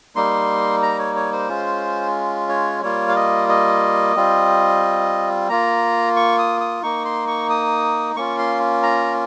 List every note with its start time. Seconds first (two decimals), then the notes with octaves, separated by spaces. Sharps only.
0.16 G3 A#3 D#4 C6
0.82 A#5
0.99 C#5
1.15 C#5
1.32 C5
1.48 G#3 C#4 F4
2.49 C#5
2.82 G3 A#3 F4 C#5
3.09 F5
3.16 D#5
3.49 D#5
4.16 G3 C4 F4
5.49 A#3 F4 A#5
6.16 C#6
6.39 D#6
6.61 D#6
6.83 A#3 D#4 C#6
7.05 C6
7.28 C#6
7.50 D#6
8.16 A#3 C#4 F4 C#6
8.39 C6
8.83 A#5